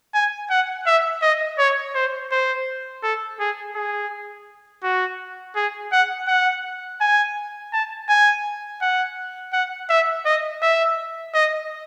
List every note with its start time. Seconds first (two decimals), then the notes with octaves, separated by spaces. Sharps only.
0.14 G#5
0.50 F#5
0.86 E5
1.22 D#5
1.58 C#5
1.95 C5
2.31 C5
3.03 A4
3.40 G#4
3.75 G#4
4.83 F#4
5.56 G#4
5.92 F#5
6.28 F#5
7.01 G#5
7.73 A5
8.09 G#5
8.82 F#5
9.53 F#5
9.90 E5
10.26 D#5
10.62 E5
11.34 D#5